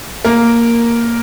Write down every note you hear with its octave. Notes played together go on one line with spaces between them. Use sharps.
A#3 A#4